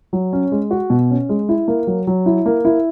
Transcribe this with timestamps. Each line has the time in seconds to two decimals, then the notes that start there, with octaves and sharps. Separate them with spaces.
0.13 F#3
0.33 C#4
0.52 G#3
0.71 F#4
0.90 B2
1.10 C#4
1.29 G#3
1.49 E4
1.68 A#3
1.87 F#3
2.07 F#3
2.26 E4
2.46 A#3
2.65 E4